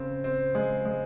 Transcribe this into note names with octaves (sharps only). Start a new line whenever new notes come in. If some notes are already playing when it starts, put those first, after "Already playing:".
Already playing: C#3 C4
C4
G#3
G#3